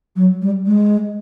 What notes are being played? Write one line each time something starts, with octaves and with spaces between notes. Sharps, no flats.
F#3
G3
G#3